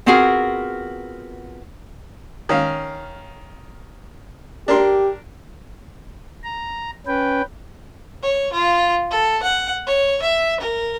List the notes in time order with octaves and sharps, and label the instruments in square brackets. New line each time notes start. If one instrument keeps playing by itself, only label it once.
[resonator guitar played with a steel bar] B3 C4 F4 F#4 G#4 A#4
[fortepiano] D#3 C#4 F5
[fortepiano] D4 A#4 C6 [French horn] G4
[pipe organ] A#5
C#4 B4 G5
[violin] C#5
F4
A4
F#5
C#5
E5
A#4